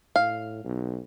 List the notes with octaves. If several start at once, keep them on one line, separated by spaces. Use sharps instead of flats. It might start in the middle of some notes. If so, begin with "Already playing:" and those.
A2 F5
B1